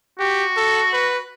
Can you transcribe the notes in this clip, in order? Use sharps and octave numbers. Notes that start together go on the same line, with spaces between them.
F#4 G4
A4
B4